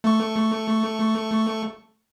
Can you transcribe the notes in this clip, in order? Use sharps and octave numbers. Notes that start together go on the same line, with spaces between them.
A3 C#6